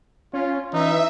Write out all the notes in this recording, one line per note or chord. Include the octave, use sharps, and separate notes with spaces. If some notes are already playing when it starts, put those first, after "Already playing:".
C#4 F4
E3 D#4 E5